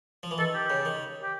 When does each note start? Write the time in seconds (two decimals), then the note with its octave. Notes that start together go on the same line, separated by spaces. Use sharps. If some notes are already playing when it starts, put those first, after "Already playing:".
0.23 F3
0.31 E3
0.38 D#3 A4
0.54 G4
0.70 C#3
0.85 D#3
1.22 G4